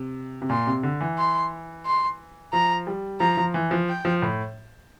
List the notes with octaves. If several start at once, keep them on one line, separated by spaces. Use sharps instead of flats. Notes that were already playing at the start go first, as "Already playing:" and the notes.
Already playing: C3
C3
A#2 C6
C3
D3
E3
C6
C6
F3 A#5
G3
F3 A#5
F3
E3
F3
G5
F3
A2